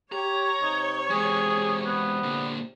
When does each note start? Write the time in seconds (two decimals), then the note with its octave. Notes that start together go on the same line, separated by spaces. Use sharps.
0.12 G4 C#5 A#5
0.62 C3 D#4
1.10 E3 G#3 G#4
1.85 B3
2.23 A#2 D3